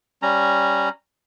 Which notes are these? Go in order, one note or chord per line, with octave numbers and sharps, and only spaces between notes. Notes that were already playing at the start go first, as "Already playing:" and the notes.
G3 C#4 A#5